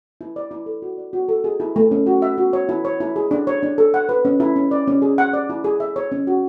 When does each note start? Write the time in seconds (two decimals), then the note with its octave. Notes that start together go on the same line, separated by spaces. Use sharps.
0.21 E4
0.36 D5
0.51 E4
0.66 A4
0.82 F#4
0.98 D5
1.13 F#4
1.29 A4
1.44 G#4
1.60 E4
1.76 A3
1.91 C#4
2.06 F#4
2.22 E5
2.38 F#4
2.53 C#5
2.69 E4
2.85 C#5
3.00 E4
3.16 G#4
3.31 D4
3.47 C#5
3.63 D4
3.78 A4
3.94 F#5
4.09 B4
4.25 C#4
4.40 E4
4.56 C#4
4.71 D5
4.87 C#4
5.02 G#4
5.18 F#5
5.33 D5
5.50 E4
5.64 G#4
5.80 E5
5.96 C#5
6.12 C#4
6.27 F#4